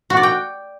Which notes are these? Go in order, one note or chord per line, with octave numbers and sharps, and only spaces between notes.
F#4
D5
G5